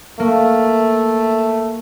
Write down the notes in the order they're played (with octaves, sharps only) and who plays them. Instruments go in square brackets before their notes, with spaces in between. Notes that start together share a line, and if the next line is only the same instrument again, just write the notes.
[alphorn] A3 [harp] A#3